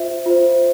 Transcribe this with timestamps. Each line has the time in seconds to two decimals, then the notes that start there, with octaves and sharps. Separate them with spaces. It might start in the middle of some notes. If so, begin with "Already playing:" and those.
Already playing: F4 C5 E5
0.26 F4 C5